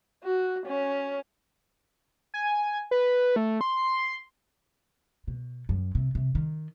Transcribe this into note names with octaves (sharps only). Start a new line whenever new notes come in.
F#4
C#4
G#5
B4
A3
C6
B2
F#2
C3
C3
D#3